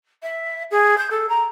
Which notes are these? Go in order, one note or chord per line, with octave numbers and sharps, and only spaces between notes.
E5
G#4
G6
A4
A#5